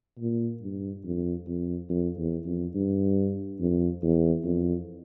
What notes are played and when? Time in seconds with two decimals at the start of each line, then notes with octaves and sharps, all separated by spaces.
0.19 A#2
0.62 G2
1.04 F2
1.47 F2
1.89 F2
2.18 E2
2.46 F2
2.74 G2
3.60 F2
4.02 E2
4.45 F2